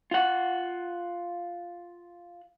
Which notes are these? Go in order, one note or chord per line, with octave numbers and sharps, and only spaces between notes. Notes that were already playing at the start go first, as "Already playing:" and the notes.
F4 F#5